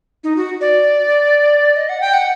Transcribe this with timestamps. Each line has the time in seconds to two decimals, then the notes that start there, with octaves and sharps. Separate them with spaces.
0.24 D#4
0.36 F#4
0.61 D5
1.76 D#5
1.89 F#5
2.01 G5
2.13 F#5